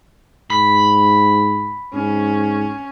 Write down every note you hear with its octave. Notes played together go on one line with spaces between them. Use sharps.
G#2 B5
G#2 C#4